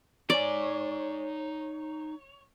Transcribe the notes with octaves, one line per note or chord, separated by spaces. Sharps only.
D#4 C#5 D5 G#5